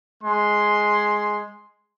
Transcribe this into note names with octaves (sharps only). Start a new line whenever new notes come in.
G#3 C6